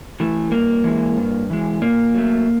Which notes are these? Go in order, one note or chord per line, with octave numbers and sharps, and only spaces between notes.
E3 A3
G2 A#3
E3 G#3
G2
E3 G#3
A#2 A#3
F#3 A3